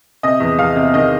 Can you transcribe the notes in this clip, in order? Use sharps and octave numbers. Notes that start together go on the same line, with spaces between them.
C3 D#5
E2
E2 F5
C3
D#3 D#5